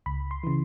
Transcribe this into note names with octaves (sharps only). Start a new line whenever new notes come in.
C#2 B5
C6
C#3 E3